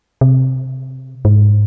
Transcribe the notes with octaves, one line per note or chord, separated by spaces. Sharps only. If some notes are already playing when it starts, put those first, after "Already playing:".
C3
G#2